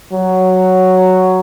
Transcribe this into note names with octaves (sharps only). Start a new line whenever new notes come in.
F#3